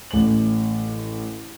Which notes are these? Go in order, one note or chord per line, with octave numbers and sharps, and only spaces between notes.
A1 F#7